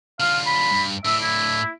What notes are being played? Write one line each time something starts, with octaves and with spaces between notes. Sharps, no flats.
D3 F4 F5
B5
G2
A2 D4 E5
E4